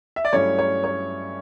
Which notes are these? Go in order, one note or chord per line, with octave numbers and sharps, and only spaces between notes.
E5
D5
G2 F#3 A3 C#4 E4 C#5
C#5
C#5